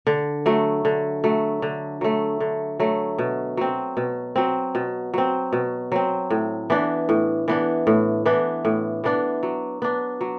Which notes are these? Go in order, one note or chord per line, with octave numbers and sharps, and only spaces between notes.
D3
F#3 A3
D3
F#3 A3
D3
F#3 A3
D3
F#3 A3
B2
F#3 C4
B2
F#3 C4
B2
F#3 C4
B2
F#3 C4
A2
E3 B3 D4
A2
E3 B3 D4
A2
E3 B3 D4
A2
E3 B3 D4
F#3
B3 D4
F#3